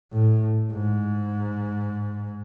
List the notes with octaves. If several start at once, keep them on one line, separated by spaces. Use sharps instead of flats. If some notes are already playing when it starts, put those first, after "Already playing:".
A2
G#2